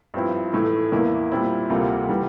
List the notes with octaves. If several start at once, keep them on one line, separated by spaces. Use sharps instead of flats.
G2 F3 C4 E4
A2 E3 A3 E4
E2 E3 A#3 E4
A#2 G3 C4 E4
D2 C3 G3 A#3 F4
E3 G3